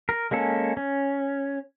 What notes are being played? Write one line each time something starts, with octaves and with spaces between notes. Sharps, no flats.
A#4
G#3 A#3 C#4 A4
C#4